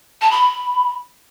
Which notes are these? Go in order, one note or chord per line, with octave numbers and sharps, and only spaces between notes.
A5
B5